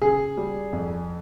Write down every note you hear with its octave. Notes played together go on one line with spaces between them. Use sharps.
C#3 G#4
G3
F2